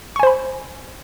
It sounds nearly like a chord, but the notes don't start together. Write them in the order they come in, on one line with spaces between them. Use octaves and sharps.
C#6 G#5 C5 B5